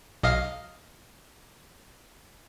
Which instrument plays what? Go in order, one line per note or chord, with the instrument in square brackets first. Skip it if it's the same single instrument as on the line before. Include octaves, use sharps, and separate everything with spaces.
[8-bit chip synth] B1 D#5 F5